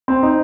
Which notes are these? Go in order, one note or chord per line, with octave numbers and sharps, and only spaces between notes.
C4
D#4